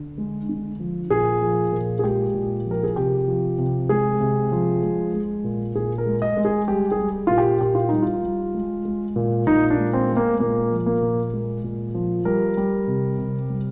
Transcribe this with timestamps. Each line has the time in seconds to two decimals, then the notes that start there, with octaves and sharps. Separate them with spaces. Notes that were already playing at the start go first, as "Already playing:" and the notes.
Already playing: D3
0.18 G#3
0.49 D3
0.80 F3
1.10 A#2 G#4
1.42 F3
1.72 A#2
1.99 G#4
2.03 G#3 G4
2.34 A#2
2.66 F3
2.71 A#4
2.83 G#4
2.96 C3 G4
3.28 F3
3.58 C3
3.89 G#3 G#4
4.20 C3
4.52 F3
4.82 G#3
5.14 G#3
5.44 A#2
5.75 A#2 G#4
5.98 A#4
6.06 G#3
6.22 D#5
6.37 G#3
6.45 G#4
6.68 G3 G4
6.92 G#4
6.99 G3
7.27 A#2 F4
7.38 G4
7.61 A#2 G4
7.75 F4
7.89 G3 D#4
8.02 F4
8.23 G3
8.54 G#3
8.85 G#3
9.16 A#2
9.47 A#2 D#4
9.70 D4
9.78 G#3
9.93 C4
10.09 G#3
10.17 A#3
10.40 A#2 A#3
10.71 F3
10.86 A#3
11.02 A#2
11.33 G#3
11.64 A#2
11.95 F3
12.25 G3 A#4
12.57 G3
12.88 C3
13.18 C3
13.49 G3